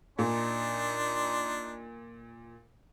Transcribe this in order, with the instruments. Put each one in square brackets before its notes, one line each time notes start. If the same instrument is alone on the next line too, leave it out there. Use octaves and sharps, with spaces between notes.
[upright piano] A#2 [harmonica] D4 D#4 C6